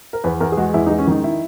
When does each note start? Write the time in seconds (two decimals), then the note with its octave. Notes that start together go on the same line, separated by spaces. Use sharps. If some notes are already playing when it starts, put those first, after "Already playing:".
0.13 A#4
0.24 E2 B4
0.40 E2 A#4
0.52 G#4
0.57 G#3 F#4
0.74 E2 E4
0.86 D#4
0.90 G#3
0.99 C#4
1.07 D#3 D#4
1.24 E4